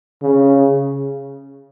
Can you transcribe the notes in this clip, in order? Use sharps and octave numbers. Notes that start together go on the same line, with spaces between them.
C#3